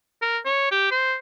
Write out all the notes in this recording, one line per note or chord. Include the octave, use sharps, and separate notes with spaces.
A#4
C#5
G4
C5